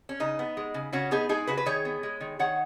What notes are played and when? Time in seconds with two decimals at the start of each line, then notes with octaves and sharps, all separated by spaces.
0.09 C#4
0.20 C#3 D#4
0.39 B3
0.57 G#3
0.74 C#3
0.93 C#3 C#4 F#4
1.11 B3 D#4 G#4
1.29 G#3 D#4 G#4
1.47 C#3 F#4 B4
1.57 B4
1.66 D#3 G#4 C#5
1.85 B3
2.03 G#3
2.21 D#3
2.39 D#3 C#5 F#5